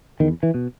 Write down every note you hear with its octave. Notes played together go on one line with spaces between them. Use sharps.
E2 D#3
E3
B2